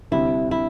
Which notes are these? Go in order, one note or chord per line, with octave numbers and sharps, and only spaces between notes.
D2 C3 G3 C4 E4
E4